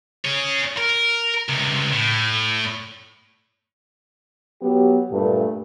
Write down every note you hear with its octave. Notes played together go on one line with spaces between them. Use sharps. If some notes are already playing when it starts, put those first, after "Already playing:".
G#4 C#5
A#4
C#2 C3
A2
F#3 B3 G4
G2 A#2 A3 B4